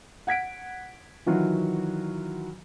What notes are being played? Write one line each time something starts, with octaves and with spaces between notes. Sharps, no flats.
F#5 G#6 B6 D7
D#3 E3 F#3 F4 F#4